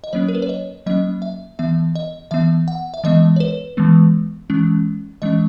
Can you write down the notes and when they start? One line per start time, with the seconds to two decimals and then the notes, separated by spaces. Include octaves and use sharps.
0.04 D#5
0.13 F#3 A#3 C#4 C#5
0.28 A#4
0.35 B4
0.42 C#5
0.49 D#5
0.86 F#3 A#3 C#4 D#5
1.22 E5
1.59 E3 B3 E5
1.95 D#5
2.31 E3 B3 E5
2.68 F#5
2.94 E5
3.04 E3 G#3 B3 D#5
3.36 C#5
3.40 B4
3.77 E3 G#3 B3
4.50 E3 G#3 C#4
5.22 E3 G#3 C#4 D#5